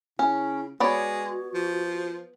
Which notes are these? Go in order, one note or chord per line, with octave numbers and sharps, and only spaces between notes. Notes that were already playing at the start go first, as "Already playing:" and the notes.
C#3 C#4 E4
G#3 B3 F#4 C#5 D5
F3